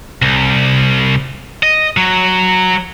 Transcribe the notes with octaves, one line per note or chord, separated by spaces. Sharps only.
C2
D#5
F#3